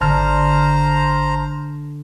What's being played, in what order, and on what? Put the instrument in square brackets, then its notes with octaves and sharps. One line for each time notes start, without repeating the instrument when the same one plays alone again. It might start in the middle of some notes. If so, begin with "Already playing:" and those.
[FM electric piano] G#1 A5 F6 [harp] D3 [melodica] C5 A#5